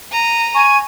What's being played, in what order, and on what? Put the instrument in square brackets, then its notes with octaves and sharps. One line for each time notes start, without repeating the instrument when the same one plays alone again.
[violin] A#5 D#7
[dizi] G#5 [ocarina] C#6